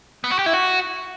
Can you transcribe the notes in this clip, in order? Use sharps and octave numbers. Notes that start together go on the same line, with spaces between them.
B3
F#4
G4
E4
F#4